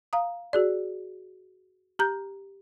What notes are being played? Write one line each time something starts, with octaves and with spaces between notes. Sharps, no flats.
F5 A#5 D#6
F#4 G#4 D5
G4 A#5 G6